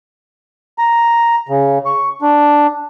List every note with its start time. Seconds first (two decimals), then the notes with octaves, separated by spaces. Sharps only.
0.78 A#5
1.49 C#3
1.86 C#6
2.22 D4